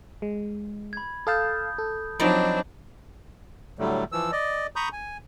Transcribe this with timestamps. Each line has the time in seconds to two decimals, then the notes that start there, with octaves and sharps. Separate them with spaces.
0.22 G#3
0.93 B5 G#6
1.27 A4 F5 A5 D#6 G6
1.78 A4
2.20 F3 F#3 C4 D4 D#4 D5 B5 G6
3.79 A2 D3 F#3 G3 A3
4.12 E3 F3 E6
4.32 D5 D#5
4.76 A#5 B5 C#6 D#6 G6
4.92 G#5